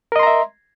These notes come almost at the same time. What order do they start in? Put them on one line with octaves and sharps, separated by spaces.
A#4 D#5 C6 A#5 E5